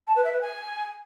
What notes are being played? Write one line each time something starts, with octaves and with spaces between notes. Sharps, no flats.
A5
B4
E5
B4
G#5